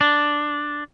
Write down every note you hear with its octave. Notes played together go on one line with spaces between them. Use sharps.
D4